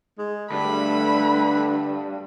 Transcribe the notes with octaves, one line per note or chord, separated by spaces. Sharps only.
G#3
G2 D3 A3 B5